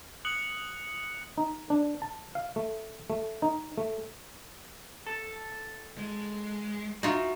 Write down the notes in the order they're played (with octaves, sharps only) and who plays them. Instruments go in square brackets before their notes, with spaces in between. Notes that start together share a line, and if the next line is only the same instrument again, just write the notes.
[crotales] D#6 F#6 C#7 F#7
[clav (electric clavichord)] D#4
D4
A5
F5
A3
A3
D#4
A3
[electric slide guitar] A4
[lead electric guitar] G#3
[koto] D#4 F4 [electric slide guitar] F#4 E5